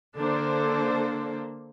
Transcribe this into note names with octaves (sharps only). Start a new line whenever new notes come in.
D3 A#3 D4 A4 C5